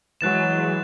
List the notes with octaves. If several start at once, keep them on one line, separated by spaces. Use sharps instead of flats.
E3 F#3 G#3 F#6 A6 E7